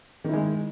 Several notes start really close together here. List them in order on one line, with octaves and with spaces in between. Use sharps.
D#3 E4 G#3